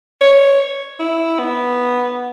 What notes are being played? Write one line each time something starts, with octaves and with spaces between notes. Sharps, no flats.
C#5
E4
B3